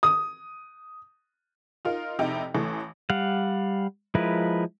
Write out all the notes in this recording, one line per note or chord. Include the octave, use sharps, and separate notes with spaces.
D#6
D#4 F4 A#4
F1 C3 D#4 E4 G5
A1 E3 A3
G3 F5 F#5
F3 G#3 E4 A#4 B4